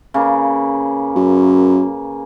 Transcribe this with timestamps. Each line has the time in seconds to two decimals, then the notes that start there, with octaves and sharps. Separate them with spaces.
0.14 C#3 A#3 B4
1.16 F#2